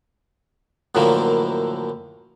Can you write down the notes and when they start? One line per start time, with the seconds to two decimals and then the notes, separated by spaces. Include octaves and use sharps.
0.95 F#2 A2 D3 E3 F3 A#3